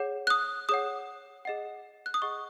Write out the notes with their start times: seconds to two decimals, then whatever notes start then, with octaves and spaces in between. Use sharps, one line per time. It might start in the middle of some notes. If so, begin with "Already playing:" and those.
Already playing: G#4 C#5 F#5
0.27 F#6
0.30 D#6
0.69 G#4 C#5 F#5 D#6
1.45 G#4 D#5 F#5
2.06 F#6
2.14 D#6
2.22 G#4 D#5 F#5 C#6